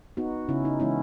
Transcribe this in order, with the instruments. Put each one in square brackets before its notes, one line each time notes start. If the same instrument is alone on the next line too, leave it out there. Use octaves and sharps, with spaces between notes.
[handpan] B3 D#4 F#4
C#3 C#4 E4
D#4
E3 G#3 B3 C#4 E4